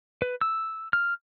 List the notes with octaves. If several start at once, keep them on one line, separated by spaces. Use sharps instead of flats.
B4
E6
F6